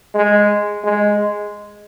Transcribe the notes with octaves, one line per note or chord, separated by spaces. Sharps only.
G#3
G#3